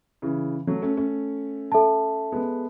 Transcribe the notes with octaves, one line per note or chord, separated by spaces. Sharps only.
C#3 E3
F#3 A3
A3 C#4
A3 C#4
A4 E5 A5
G#3 B3